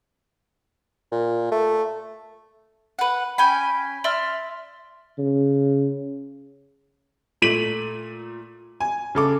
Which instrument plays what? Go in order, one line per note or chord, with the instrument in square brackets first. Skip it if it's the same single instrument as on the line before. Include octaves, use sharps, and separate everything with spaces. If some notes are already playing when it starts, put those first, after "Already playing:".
[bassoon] A#2
A3
[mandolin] B4 F#5
C#4 G5 G#5 B5
D5 E5 C6 F6
[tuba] C#3
[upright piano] A#2 A3 B6 D#7 F#7
G#5
C#3 A4 D6